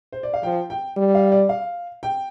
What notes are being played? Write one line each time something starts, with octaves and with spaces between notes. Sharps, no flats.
C5
D5
F5
F3 G5
G5
G3
F5
D5
F5
G5